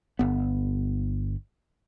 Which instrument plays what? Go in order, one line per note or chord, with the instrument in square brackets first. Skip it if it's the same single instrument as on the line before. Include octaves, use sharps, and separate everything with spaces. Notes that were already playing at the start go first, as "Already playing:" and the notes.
[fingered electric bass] G1 B3